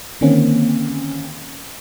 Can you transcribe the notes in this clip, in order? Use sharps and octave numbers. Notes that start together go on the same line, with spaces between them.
D3 D#3 A#3 C4 C#4